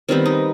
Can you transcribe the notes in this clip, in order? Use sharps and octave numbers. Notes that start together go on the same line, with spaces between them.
D#3 G3 B3 C4
D#4